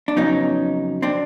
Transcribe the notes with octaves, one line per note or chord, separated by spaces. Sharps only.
D4
F2 C#3 F#3 B3 C#4 D#4
C4 D4